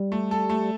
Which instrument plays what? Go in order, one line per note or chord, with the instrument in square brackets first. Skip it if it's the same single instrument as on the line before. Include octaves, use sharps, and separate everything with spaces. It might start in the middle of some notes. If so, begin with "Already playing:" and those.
Already playing: [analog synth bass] G3
[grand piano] A3
A4
A3